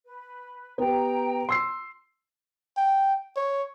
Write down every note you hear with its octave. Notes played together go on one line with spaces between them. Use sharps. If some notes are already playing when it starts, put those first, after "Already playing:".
B4
B3 G4 G5 A#5
C6 E6 C7
G5
C#5